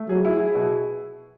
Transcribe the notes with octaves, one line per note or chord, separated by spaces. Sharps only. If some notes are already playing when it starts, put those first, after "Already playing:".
Already playing: A3
F#3 G#4
E4
G#4
B2